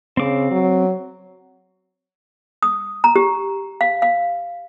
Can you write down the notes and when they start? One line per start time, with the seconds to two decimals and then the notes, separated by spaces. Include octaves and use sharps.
0.17 C#3 C4 D6
0.51 F#3
2.63 D#6
3.04 A#5
3.16 G4
3.81 F5
4.02 F5